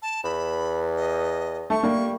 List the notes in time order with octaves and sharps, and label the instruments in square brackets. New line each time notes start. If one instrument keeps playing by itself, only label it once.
[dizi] A5
[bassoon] E2 [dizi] B5
[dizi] D#5
[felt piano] A3 [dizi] C#6
[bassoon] G3 [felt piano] A#3